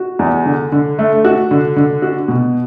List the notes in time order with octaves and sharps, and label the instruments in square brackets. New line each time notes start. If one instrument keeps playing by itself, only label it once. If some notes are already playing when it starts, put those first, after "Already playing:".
Already playing: [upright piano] F#4
E2
D3
D3
A3
F#4
D3
D3
F#4
B2